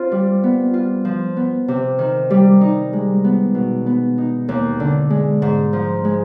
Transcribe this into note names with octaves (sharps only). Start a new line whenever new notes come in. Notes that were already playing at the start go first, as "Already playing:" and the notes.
Already playing: C4 F4
G3
B3
F4
F3
B3
C3
D#3
G3
D#4
G#3
B3
B2
B3
D#4
D#2
D3
G#3
G#2
F3
G#3